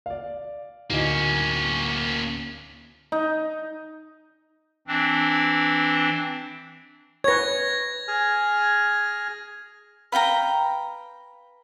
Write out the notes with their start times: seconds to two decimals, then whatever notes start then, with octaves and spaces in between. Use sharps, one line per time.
0.06 D5 F5
0.90 D1 A#3 C#4 D#4
3.12 D#4
4.87 E3 C4 D4
7.24 B4 C#5 G#6 A#6
8.08 G#4 G#5 F6
10.12 B4 F5 G5 A#5